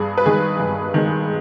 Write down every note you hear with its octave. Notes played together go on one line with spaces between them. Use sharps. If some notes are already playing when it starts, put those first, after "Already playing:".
Already playing: G2 G#4
B4
D#3 G#3 G#4
G2
D#3 G#3